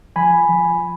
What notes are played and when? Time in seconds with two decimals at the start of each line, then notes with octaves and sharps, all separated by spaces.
0.16 F3 G#5 B5
0.49 F3